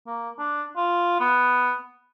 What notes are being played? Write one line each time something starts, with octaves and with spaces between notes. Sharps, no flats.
A#3
D4
F4
B3